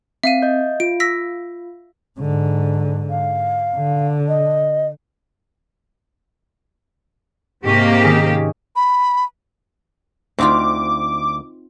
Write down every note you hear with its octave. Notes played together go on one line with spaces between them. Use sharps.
C4 E5 F5 D#7
D#5 G6
F4 D7
E6 A#6 B6
G#2 D3
F5
D3
D#5
G#2 C3 A#3 G4 C#6 D#7
D#3 C#4 G#4
B5
D2 C4 D#4 F4 D6